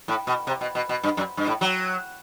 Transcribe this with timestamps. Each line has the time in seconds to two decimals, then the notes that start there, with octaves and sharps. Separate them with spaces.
0.08 A2
0.27 B2
0.47 C3
0.61 B2
0.75 B2
0.89 B2
1.03 G2
1.17 F#2
1.37 G2
1.47 A2
1.61 F#3